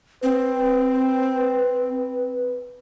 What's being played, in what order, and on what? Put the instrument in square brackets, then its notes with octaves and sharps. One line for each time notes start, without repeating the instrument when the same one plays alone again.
[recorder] C4 [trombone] B4